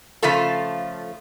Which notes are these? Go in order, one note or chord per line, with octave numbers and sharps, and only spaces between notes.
C#3 F3 A3 F4 A4